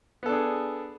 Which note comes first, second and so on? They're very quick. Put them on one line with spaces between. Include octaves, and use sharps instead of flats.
B3 A4 D4 G#4